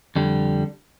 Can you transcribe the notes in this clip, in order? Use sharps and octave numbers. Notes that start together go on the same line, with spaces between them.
F2 D3 G3